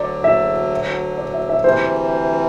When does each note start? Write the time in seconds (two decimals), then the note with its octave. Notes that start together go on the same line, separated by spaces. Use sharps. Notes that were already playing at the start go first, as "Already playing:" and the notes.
Already playing: D2 D3 F#3 D5
0.24 E5
1.18 D5
1.34 E5
1.49 E5
1.64 D2 C3 E3 G3 C5